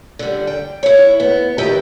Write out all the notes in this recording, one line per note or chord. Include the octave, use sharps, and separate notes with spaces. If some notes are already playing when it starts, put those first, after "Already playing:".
D3 G3
G5
E4 C#5
B3
D#3 E4 G4 B4 D#5 G5